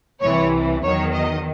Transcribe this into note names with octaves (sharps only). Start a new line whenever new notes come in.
C2 C3 E3 C#5
E2 D#3 F#3 C#5
D#5